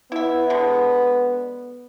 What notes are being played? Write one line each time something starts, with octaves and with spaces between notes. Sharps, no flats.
B3 E4 E5
D3 G#3